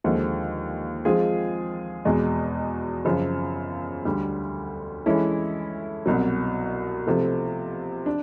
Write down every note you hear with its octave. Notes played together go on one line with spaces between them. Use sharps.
D#2 D3 F3 G#3
F3 G#3 C4 F4 G#4
E2 B2 G#3
F#2 C#3 F3
D2 D3 G3
E3 G#3 C#4 E4 A4
C2 B2 F#3
C3 F3 A3
D4